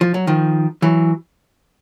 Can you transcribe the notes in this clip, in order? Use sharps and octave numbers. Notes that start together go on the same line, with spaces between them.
F3
F#3
D#3 F3
E3 F#3